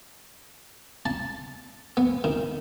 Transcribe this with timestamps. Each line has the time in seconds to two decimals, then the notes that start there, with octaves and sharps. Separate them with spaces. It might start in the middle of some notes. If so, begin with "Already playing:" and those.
1.06 A5
1.97 B3
2.24 D#3